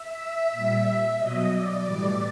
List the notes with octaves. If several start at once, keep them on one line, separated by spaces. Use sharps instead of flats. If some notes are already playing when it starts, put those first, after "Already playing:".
Already playing: E5
A#2
G3
B2 F#3 D#5
D5
A2 E3 G3